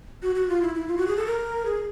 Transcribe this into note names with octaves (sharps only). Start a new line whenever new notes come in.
F#4
F#4
F4
E4
E4
F4
F#4
G#4
A4
A#4
G#4